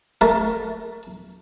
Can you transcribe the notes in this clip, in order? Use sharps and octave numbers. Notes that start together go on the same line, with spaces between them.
A3 A#4